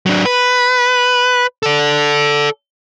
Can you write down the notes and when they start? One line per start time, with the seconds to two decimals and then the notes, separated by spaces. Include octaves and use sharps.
0.06 F#3 D4
0.26 B4
1.63 A4 D5